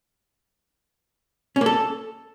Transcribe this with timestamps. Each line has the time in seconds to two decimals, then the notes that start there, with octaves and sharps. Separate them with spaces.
1.56 C#4
1.61 A#3
1.66 A4